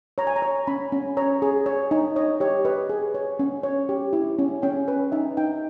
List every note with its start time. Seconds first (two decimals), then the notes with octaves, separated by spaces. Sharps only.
0.18 C#5 A#5
0.27 G#5
0.36 A#5
0.42 C#5
0.67 C#4 B5
0.92 C#4
1.17 C#5 A#5
1.42 G#4
1.66 C#5
1.91 D#4
2.16 C#5 D#5
2.40 G4 C#5
2.65 B4 D#5
2.89 G#4
3.14 C#5
3.39 C#4
3.63 C#5
3.89 G4
4.13 E4
4.39 C#4
4.62 C#4 G5
4.88 B4
5.12 D#4 E5
5.37 D#4 G5